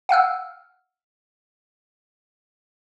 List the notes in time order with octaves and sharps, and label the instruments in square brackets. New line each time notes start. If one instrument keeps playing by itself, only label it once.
[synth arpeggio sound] F5 F#5 E6 F6